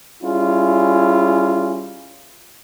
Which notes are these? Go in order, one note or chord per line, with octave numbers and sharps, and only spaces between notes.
G3 C#4 E4 F4 G#4